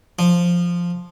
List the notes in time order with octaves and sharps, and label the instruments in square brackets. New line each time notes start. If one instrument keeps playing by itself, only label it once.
[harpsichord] F3